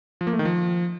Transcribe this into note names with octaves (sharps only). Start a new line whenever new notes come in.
F3
A#3
A3
D#3
F3